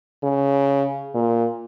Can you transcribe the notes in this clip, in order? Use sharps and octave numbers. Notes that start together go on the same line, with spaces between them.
C#3
A#2